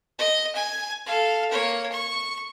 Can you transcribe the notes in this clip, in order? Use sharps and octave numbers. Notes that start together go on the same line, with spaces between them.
D#5
G#5
A4 F5
A#3 C#5
C#6